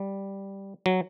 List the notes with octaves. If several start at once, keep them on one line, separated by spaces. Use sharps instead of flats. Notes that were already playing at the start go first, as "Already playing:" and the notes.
Already playing: G3
F#3